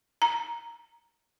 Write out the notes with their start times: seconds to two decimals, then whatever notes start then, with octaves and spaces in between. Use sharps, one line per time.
0.22 A#5